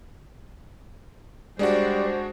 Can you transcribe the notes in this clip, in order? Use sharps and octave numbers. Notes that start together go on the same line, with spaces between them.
G3 G#3 D4 F#4 C5 D5